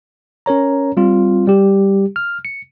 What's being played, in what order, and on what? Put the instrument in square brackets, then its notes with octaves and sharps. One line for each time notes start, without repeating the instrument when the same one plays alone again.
[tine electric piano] C#4 A#4 C#5 A#5
G3 C4 F4
G3 G4
F6
C#7